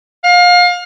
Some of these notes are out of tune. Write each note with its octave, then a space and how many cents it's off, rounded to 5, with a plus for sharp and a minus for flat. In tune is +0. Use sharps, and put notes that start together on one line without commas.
F5 +30